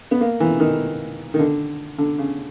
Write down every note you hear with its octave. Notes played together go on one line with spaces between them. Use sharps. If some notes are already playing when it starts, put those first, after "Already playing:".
B3
A#3
E3
D#3
D#3
D3
D3
C#3